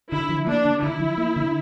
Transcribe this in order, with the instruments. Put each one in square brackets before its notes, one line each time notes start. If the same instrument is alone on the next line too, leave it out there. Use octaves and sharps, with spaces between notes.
[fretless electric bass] D3 [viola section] E4
[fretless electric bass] F3
[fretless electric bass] A#3 [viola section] D4
[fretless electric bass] D3
[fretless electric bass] D3 [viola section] E4
[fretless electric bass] F3
A#3
D3